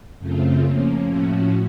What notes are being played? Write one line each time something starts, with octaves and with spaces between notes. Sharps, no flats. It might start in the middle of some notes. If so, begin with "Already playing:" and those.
F#2 C#3 A3 C4 F4
F3 A#3 C#4
A2 F3 A3 C#4 F#4